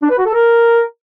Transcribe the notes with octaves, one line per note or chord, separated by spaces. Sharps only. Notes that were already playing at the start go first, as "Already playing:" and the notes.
D4
B4
F#4
A4
A#4